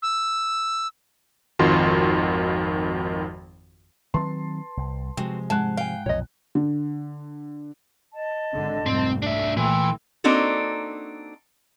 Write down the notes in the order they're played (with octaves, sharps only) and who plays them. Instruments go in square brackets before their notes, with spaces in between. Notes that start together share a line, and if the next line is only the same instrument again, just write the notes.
[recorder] E6
[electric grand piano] G#1 F2 D#3 F4 F#4 C6
[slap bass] D#3 F#3 C4 [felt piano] B4 A5 C6
[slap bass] C2
[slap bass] C3 F3 [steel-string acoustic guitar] G#3 [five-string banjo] C4 F#4
[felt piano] G#2 F#5 F#6 [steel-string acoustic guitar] G#3 [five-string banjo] A5
[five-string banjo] F5 G#5 [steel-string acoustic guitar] G5
[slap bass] B1 F2 A#2 [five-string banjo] C#5 D#5
[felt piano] D3
[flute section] D#5 A5
[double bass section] G#1 D3
[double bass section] F1 C2 [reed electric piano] G#2 [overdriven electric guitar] C4
[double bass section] A3 [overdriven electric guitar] D4 E5
[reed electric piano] A#2 [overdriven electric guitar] E3 [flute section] G5 C6 E6
[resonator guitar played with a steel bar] A#3 C4 D4 D#4 F#4 A4